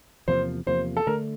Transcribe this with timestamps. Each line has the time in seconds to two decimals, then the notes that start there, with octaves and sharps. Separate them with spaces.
0.28 E2 C3 F3 A#3 C5
0.67 E2 C3 F3 A#3 C5
0.97 A4
1.07 D3 A3 D4 A#4